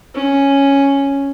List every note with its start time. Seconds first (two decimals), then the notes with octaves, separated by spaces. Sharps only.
0.14 C#4